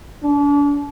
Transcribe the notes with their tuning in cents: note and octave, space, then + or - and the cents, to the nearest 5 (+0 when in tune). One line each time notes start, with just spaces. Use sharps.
D4 -35